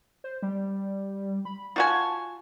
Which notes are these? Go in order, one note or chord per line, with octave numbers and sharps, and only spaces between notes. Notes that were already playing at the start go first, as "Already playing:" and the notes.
C5
G3
B5
F4 F#4 G#5 A5